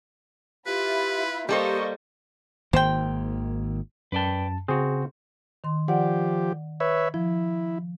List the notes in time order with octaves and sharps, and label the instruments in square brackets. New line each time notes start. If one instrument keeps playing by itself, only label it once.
[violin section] E4 F4 B5 [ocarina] G4 [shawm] B4
[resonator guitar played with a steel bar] G3 A4 C5 [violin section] A#3 D#5 C#6 [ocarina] G4
[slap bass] G#1 D#3 A#3 [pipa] C5 G5
[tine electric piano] F#2 A5 [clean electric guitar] B4 D5 G5
[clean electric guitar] C#3 [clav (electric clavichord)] C4 F#4 [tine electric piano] G#4
[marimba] D#3 C6
[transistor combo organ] F3 G4 [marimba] D5 F#5
[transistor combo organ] B4 C#5 E5
[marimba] F3 [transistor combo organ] E4